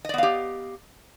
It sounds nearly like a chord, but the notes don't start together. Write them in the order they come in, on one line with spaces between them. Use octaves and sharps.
D#5 D5 B3 F5 G4